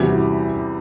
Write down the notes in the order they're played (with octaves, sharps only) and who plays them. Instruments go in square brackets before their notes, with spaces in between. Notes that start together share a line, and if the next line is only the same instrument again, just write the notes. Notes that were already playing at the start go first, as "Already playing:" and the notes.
Already playing: [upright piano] E2 C3 G3 [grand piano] F#4
[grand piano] E4